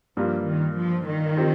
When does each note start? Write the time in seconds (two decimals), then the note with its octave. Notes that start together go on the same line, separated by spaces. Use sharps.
0.16 G2 F3 G3 A#3 F4
0.46 D#3
0.77 F3
1.07 D#3
1.36 F3 C4 G4